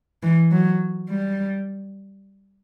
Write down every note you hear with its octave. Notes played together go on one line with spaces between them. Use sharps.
E3
F#3
G3